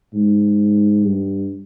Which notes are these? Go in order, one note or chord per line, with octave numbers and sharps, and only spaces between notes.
G#2
G2